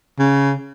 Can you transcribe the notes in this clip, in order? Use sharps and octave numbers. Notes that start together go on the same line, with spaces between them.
C#3